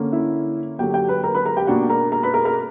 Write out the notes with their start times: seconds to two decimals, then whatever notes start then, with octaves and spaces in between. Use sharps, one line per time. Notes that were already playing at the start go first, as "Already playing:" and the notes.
Already playing: D3 A#3 C#4
0.12 E4 E5
0.79 D3 F#3 A#3 G4 G5
0.94 G4 G5
1.08 B4 B5
1.24 A#4 A#5
1.34 B4 B5
1.46 A#4 A#5
1.56 G4 G5
1.67 B2 A#3 D4 F#4 F#5
1.90 A#4 A#5
2.12 A#4 A#5
2.23 B4 B5
2.34 A#4 A#5
2.45 A#4 A#5